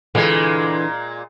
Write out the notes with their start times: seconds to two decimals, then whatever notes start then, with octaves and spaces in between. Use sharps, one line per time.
0.15 A#2 D3 E3 G#3